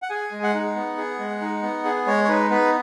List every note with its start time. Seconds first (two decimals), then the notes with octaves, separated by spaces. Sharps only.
0.02 F#5
0.10 G#4 G#5
0.31 G#3
0.43 F#5
0.54 D#4
0.76 B3
0.98 G#4
1.19 G#3
1.41 D#4
1.63 B3
1.85 G#4
2.07 G#3 C#5
2.24 C#5
2.28 D#4 B4
2.50 B3 B4